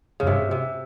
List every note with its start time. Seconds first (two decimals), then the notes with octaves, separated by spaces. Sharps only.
0.20 F2 C#3
0.27 G2 C3
0.51 C3